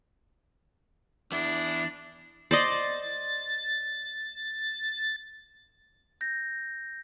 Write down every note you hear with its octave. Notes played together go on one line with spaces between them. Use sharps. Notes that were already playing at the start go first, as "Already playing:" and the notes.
E2 D4 E4
C5 D5 D#5 A6
G6 A#6